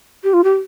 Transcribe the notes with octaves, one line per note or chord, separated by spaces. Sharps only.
G4
F4
G4